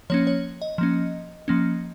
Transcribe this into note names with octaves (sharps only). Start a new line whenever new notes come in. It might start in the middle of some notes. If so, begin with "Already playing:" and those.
F3 A#3 C#4 C#5
C#5
D#5
F3 A#3 C#4
F3 A#3 C#4